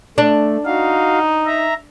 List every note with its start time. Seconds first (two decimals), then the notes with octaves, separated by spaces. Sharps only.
0.18 A3 D4
0.66 D#4 F#4 F5
1.46 E5 A#5